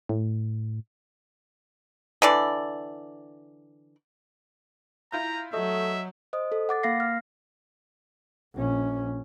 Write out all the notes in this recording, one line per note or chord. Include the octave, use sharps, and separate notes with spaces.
A2
D3 E3 D5
E4 F4 A#5 G6
F#3 A3 D#5 E5
C5 D#5 D#6
A4
F#5 D6 A6
A#3 F5 A#6 C7
F6
A#1 C#4